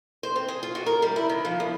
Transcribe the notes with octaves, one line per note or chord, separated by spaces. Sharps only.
C5
C4
G#4
F4
F#4
A#4
G3
E4
D#3
F3
E2